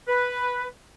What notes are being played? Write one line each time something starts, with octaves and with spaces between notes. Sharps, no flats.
B4